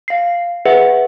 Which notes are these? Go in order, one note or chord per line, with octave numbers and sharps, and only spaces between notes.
F5 C7
G#4 B4 E5 F#5